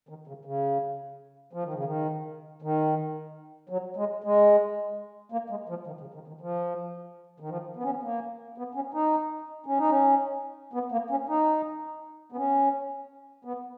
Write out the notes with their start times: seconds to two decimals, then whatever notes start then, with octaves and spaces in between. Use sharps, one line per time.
0.09 D#3
0.27 C#3
0.45 C#3
1.53 F3
1.63 D#3
1.74 C#3
1.84 D#3
2.62 D#3
3.69 F#3
3.96 G#3
4.24 G#3
5.32 A#3
5.50 G#3
5.69 F3
5.87 D#3
6.01 C#3
6.14 D#3
6.28 D#3
6.41 F3
7.40 D#3
7.49 F3
7.76 B3
7.83 C#4
7.90 B3
8.03 A#3
8.58 B3
8.75 C#4
8.94 D#4
9.66 C#4
9.78 D#4
9.89 C#4
10.74 B3
10.92 A#3
11.10 C#4
11.29 D#4
12.32 B3
12.36 C#4
13.45 B3